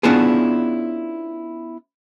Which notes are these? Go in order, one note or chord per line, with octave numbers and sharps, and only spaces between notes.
B3 C#4 D4 E4 F4 G#4